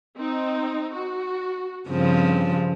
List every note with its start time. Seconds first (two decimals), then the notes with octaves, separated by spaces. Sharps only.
0.17 C4 D#4
0.94 F#4
1.89 G2 C#3 F3 C4